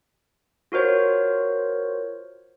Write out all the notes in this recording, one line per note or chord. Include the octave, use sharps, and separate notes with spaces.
F4 F#4 A#4 C5 C#5